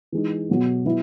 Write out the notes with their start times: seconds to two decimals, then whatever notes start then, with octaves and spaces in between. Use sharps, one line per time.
0.12 E3 G#3 D#4
0.49 B2 F#3 B3
0.86 F#3 B3 E4